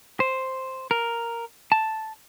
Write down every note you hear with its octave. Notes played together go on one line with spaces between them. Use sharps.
C5
A#4
A5